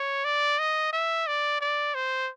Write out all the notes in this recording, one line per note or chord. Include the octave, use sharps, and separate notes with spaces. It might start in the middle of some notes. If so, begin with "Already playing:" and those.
Already playing: C#5
D5
D#5
E5
D5
D5
C5